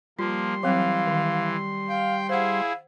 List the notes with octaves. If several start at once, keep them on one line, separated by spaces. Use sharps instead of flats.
F3 G3 A#3 F4 C6
E3 F#3 C4 F5
D#3
F5 G5
E4 G#4 C5 F5 F#5